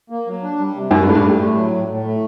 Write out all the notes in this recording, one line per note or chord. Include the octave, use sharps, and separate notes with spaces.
A#3
F#3
D4
G3
C3
F#2 F#4
G2
A2 D4
G2
A2 G3
A3
F#3
A2
A2
A3